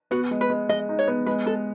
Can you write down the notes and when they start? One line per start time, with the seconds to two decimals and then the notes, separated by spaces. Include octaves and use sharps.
0.11 B3 F#4
0.31 G#3
0.41 B4
0.50 G#3
0.69 G#3 D#5
0.89 D#4
0.99 C#5
1.08 B3
1.26 G#3 B4
1.46 G#3 A4